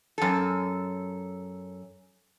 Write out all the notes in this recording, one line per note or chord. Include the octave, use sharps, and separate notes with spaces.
F#2 A4